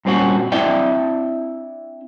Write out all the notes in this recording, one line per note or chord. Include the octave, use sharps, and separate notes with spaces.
G2 A#2 C4 C#4 F#4
C4 D4 E4 D5 E5 G5